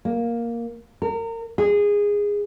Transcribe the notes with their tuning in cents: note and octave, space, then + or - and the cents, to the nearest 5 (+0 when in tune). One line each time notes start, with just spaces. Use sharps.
A#3 +5
A#4 -30
G#4 -15